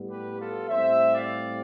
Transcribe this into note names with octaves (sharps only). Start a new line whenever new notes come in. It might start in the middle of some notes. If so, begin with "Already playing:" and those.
Already playing: A2 G3 B3
G4 B4
F4 A4
A2 G3 C4 C5 E5
D5 F5